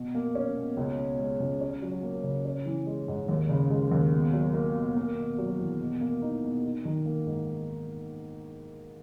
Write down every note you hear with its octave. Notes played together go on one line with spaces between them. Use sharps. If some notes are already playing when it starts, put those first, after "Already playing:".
Already playing: B2
A#3
C#4
B2
C#2
B2
G#3
C#2
C#4
F#3
A#3
C#3
C#4
E3
G#3
G#2
D#2
C#3
G#3
D#2
B2
F#3
A#3
B2
A#3
B2
F#3
E2
B2
A#3
D#4
B2
D#4
D#3
A#3
G#2